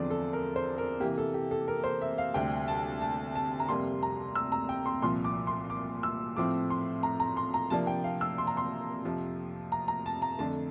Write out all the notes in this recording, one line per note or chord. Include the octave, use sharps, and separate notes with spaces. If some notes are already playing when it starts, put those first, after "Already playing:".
Already playing: E2 D3 F3 C4 D5
A4
A#4
C5
A#4
C3 E3 A#3 G4
A4
G4
A4
A#4
C5
E5
F5
D2 C3 G3 C4 G5
A5
A5
A5
A#5
F2 C3 G3 A#3 C6
A#5
E6
A#5
G5
C6
C2 A#2 F3 C6
D6
C6
D6
E6
A2 F3 C4 D6
C6
A#5
A#5
C6
A#5
C3 F3 A#3 D4 A5
G5
F5
E6
C6
A#5
C6
F2 C3 F3
A#5
A#5
A5
A#5
F2 D3 A3 A5